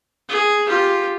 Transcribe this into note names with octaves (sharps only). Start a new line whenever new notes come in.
G#4
F4 G4